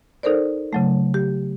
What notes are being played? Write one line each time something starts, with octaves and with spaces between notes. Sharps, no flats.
D#4 A4 A#4 C5 D5
C#3 F#3 A3
G4